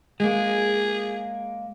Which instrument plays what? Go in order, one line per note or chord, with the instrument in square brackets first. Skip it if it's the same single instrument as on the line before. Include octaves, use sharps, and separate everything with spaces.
[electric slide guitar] G#3 A#3 [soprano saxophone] G#4